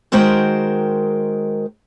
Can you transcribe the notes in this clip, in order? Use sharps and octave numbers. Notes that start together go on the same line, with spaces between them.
D#3 G#3 F#4 A#4 C5 G5